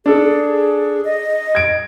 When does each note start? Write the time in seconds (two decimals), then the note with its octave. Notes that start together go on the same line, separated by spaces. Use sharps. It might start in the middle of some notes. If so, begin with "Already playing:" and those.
0.06 D4 G#4 A4
1.05 D#5
1.55 G#6 D7